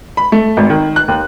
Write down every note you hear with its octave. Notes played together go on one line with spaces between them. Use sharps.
B5
A3
G#1
D#3
F#6
D#2